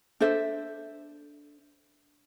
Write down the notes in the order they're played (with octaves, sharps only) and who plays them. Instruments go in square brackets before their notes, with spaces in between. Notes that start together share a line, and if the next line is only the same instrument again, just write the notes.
[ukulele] D4 A4 C5 E5